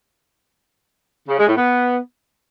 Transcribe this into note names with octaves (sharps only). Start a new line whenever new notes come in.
C#3
G#3
A2
B3